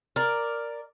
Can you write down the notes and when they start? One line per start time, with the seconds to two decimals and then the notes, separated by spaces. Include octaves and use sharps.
0.16 A#4 D5